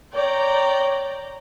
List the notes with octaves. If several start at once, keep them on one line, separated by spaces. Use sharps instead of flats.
C#5 D5 G5 A#5